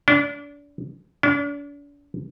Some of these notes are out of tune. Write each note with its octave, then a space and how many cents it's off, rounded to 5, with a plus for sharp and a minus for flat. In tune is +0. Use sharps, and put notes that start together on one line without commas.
D4 -30
D4 -40